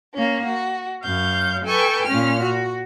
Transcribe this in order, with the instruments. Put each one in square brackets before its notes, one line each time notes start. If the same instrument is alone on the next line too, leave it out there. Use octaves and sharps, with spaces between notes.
[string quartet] A#3 C#4
F#4
F#2 C#5 F5 G6
A4 B4 G5 G#5 C#6
A#2 C#4 F6
F#4